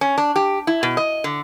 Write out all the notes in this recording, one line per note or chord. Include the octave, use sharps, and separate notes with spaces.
C#4
D4
G4
E4
B2
D#5
D3